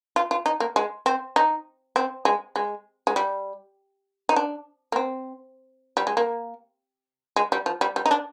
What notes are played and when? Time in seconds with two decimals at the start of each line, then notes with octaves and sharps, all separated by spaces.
0.16 F4
0.31 F4
0.46 D#4
0.60 A#3
0.76 G#3
1.06 C4
1.36 D#4
1.96 C4
2.25 G#3
2.56 G#3
3.07 G#3
3.16 G3
4.29 D#4
4.36 D4
4.92 A#3
4.96 C4
5.97 G3
6.07 G#3
6.17 A#3
7.36 G#3
7.52 G3
7.66 F3
7.81 G3
7.96 G3
8.06 D#4
8.11 D4